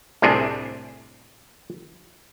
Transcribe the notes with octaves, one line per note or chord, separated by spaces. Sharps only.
C2 A2 C3 D4 G#4